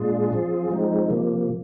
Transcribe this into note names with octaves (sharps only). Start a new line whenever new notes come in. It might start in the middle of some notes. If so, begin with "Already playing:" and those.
Already playing: A#2 G#3 D4 F4 G#4
F3 C4 F4 G#4
F3 G#3 C4 D#4
C3 F3 A#3